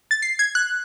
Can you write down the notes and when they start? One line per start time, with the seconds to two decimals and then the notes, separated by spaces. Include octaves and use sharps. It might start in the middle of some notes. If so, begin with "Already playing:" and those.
0.11 A6
0.22 C7
0.39 G#6
0.55 F#6